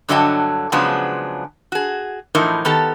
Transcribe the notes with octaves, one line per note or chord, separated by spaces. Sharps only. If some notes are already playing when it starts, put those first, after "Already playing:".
G2 D3 F#3 D#5 G5 A5
C#3 F3 F#3 G#3 B3 D4
F#4 G#4
A2 E3 F3 D#4 A#4
D#3 B3 G4 A4